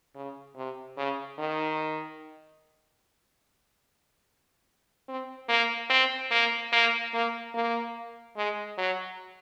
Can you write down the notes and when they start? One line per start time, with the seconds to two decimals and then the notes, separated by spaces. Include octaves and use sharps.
0.16 C#3
0.56 C3
0.97 C#3
1.39 D#3
5.09 C4
5.49 A#3
5.90 C4
6.32 A#3
6.73 A#3
7.14 A#3
7.55 A#3
8.37 G#3
8.78 F#3